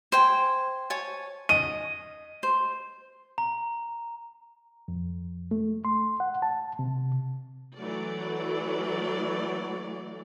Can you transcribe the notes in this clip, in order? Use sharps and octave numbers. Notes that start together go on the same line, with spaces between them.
C5 G5 G#5
C#5 G#5 A5
D#5 D#7
C5
A#5
F2
A3
C6
F#5
A5
C3
E3 F#3 A3 D5